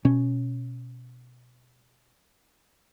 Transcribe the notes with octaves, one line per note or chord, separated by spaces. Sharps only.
B2 C#4